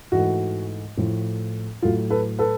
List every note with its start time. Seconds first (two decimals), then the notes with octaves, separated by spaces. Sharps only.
0.12 G#2 E3 A3 F#4
0.97 A2 F3 A3
1.82 A2 F#3 A3 F4
2.10 A4 B4
2.39 A4 B4